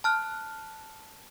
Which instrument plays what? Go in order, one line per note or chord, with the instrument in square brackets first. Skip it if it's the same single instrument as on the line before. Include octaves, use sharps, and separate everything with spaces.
[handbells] A5 F6 F#6